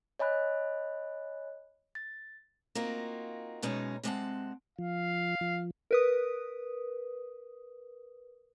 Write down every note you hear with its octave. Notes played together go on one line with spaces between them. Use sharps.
C#5 D#5 G#5 B5 F#6
A6
A#3 C4 D#4 F4 F#4
F#2 B2 G#3 C#4 D#4
C3 G#3 C4 D5 F#5 A5
F3 F5
F3
A#4 B4 D#6